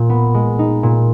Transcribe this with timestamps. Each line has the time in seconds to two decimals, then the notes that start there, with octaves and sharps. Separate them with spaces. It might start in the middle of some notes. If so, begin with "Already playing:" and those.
Already playing: A#2
0.09 B3
0.34 G#3
0.59 D#4
0.83 A#2